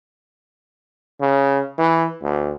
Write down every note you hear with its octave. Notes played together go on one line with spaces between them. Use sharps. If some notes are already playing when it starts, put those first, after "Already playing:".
C#3
E3
D2